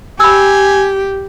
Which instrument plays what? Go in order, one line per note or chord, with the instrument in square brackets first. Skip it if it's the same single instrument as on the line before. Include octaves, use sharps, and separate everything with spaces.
[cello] G4 [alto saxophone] G#5 [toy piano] B5 E6